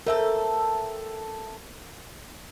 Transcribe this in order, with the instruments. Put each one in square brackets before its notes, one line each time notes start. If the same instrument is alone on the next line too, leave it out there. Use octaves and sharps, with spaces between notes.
[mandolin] A3 C4 A4 [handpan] A#4 E5